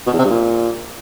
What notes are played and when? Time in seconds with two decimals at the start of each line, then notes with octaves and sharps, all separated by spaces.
0.07 B2
0.13 E2
0.19 C3
0.24 G2
0.30 A#2